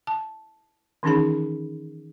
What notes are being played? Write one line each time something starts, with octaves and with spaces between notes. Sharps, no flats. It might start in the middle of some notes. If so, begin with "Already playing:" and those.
A5
D#3 E3 C#4 D#4 G#4 B5